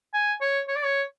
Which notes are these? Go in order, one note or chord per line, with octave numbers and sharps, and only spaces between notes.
G#5
C#5
C#5
D5
C#5